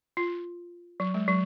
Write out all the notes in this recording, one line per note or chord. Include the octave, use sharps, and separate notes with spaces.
F4
F#3
G#3
F#3